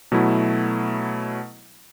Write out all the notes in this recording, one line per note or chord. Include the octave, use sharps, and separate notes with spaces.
B2 F#3 A3 E4